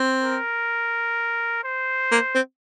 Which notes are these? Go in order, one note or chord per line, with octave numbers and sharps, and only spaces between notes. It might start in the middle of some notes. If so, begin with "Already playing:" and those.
Already playing: C4
A#4
C5
A#3
C4